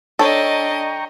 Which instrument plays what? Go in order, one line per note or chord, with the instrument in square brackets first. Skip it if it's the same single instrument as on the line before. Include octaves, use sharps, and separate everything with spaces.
[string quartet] D4 D#5 [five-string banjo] A4 C#5 [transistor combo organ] G5 A#5 C#6